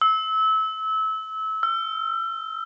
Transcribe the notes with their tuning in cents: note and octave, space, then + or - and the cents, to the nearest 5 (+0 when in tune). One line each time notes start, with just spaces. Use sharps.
E6 -25
E6 +40